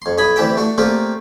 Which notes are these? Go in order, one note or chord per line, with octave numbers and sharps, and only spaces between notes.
F2 C6
B1 D#5 G#5 B5
D2 C3 E3 G4 E5 G5
A3 D4 F#4
A#2 A3 A#3 C4 F4 G4